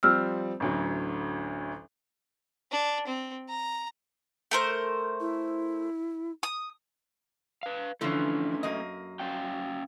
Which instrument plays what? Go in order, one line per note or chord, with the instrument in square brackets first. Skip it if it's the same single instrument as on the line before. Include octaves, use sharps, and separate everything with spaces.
[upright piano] F3 G3 C4 [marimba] E6 F6
[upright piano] A1 D2 F#3
[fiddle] D4
C4
A#5
[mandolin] A3 A#4 C5
[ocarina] E4
[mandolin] D#6
[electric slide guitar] B4 F5
[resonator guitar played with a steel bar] D3 E3 F3 [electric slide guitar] A3 C#4
[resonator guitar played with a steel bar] F#2 A#3 D#5
[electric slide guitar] C#4 F5 G5